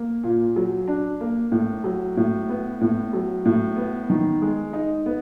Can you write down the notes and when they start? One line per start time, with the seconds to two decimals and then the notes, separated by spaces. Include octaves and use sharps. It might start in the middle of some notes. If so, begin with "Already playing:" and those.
Already playing: A#3
0.23 A#2
0.56 F#3
0.88 D4
1.21 A#3
1.52 A2
1.84 F#3
2.17 A2
2.49 B3
2.81 A2
3.13 F#3
3.45 A2
3.76 B3
4.10 D#3
4.42 G#3
4.73 D#4
5.06 B3